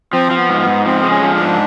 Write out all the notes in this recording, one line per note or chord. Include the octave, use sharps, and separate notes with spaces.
F3 C4
F3
B3
G#2
B3
G#2
F3 C4
G#3
C#4
F3
D4
G#2